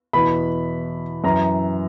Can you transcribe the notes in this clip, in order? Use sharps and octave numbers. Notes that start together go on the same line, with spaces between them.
E2 B2 B5
F#2 E3 A#5